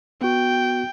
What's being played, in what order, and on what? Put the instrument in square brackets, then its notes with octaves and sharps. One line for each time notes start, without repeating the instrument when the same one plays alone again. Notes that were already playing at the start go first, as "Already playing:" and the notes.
[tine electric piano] B3 F#4 [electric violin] G5